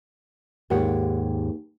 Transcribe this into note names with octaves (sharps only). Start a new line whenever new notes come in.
D#2 G#2 G4 C#5 F#5